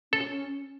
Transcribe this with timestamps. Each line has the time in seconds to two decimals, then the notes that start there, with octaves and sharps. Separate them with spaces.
0.12 C#4 A4
0.28 C#4